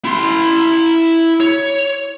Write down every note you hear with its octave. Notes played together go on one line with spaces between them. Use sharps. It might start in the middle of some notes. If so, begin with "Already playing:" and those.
E4 C6
C#5